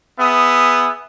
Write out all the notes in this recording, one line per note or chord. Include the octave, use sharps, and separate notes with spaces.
B3 G#4 E5 D#6